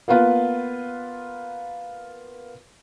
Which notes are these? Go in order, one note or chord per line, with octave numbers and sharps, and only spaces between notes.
A#3 B3 F4 B4